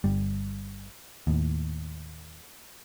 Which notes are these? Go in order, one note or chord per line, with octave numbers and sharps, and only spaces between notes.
G1 G3
D#2 A2